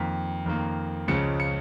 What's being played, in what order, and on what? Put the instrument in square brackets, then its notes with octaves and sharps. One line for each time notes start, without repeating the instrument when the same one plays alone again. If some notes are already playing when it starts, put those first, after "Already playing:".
Already playing: [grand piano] F2 D#3 A#3 B6
F2 D#3 A#3
C#2 C#3 F3 G#3 C#7
C#7